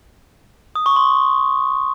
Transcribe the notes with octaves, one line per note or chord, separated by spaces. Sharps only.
D#6
C#6
C6